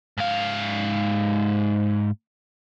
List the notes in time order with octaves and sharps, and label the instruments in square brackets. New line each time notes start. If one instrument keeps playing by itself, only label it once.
[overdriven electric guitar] G#2 F5